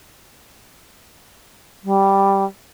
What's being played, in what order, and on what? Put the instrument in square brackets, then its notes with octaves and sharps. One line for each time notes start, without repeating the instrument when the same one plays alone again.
[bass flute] G3